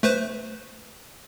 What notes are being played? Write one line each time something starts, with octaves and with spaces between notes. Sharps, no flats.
A3 B4 C5